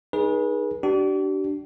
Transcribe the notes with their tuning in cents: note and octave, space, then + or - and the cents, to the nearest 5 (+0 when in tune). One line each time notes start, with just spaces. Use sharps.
D#4 +0 G#4 +0 B4 -35
D4 +0 G4 -45